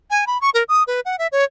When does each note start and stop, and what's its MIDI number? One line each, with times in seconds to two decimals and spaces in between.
0.11 0.25 80
0.27 0.40 83
0.41 0.50 85
0.54 0.63 70
0.69 0.83 87
0.87 1.00 71
1.05 1.16 78
1.19 1.27 76
1.32 1.44 73